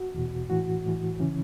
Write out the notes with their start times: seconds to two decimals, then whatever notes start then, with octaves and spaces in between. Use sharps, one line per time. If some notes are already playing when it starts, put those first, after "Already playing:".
Already playing: F#4
0.14 E2 B2
0.49 A2 E3 F#4
0.85 A2 E3
1.20 C#3 E3 C#4